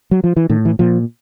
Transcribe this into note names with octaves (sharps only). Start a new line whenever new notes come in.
F#3
F3
E3
A2 D#3
E3
A#2 F3